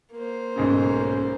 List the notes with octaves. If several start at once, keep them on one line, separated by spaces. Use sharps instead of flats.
A#3 C5
B1 G#2 C#3 C#4